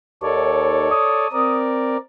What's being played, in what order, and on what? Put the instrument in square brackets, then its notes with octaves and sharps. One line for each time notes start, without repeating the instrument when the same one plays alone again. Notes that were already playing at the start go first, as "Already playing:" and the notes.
[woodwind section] D#2 [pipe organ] A4 C#5 D5
[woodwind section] D#6
[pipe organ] C4 A#4 D5